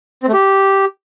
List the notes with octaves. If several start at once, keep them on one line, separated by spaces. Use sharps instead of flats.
C4
A3
G4